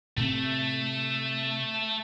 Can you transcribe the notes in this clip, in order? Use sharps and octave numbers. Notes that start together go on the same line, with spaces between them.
A2 C3 A3 C4